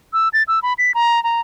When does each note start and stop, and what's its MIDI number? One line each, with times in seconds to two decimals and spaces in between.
0.13 0.29 88
0.33 0.43 93
0.48 0.59 88
0.63 0.73 83
0.78 0.92 95
0.95 1.22 82
1.24 1.41 82